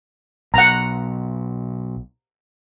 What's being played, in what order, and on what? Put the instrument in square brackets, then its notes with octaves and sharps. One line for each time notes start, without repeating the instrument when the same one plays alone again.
[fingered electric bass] B1 [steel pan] F#5 A#5